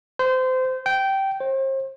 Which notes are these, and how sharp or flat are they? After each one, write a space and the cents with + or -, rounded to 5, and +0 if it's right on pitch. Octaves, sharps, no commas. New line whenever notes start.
C5 -25
G5 -15
C5 +40